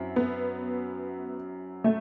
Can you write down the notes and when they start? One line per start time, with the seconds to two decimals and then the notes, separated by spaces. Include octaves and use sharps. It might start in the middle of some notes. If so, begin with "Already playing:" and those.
Already playing: F#2 F#3 C4 E4
0.16 B3
1.84 A3